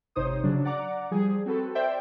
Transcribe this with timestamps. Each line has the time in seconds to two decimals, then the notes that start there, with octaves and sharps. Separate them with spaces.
0.16 G#1 C3 D#4 C5 C#5 D#6
0.43 C#3 F#3 D4
0.65 D5 F#5 A#5 D6
1.11 F3 G3 G#4
1.46 C4 F#4 A4 B4
1.75 C5 D5 E5 G5